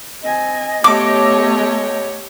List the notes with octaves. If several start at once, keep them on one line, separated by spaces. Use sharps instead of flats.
C4 D#5 G#5
A3 B3 G4 C#5 D6